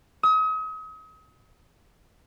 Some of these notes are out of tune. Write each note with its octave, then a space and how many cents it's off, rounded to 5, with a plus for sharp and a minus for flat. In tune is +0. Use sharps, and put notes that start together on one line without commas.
D#6 +40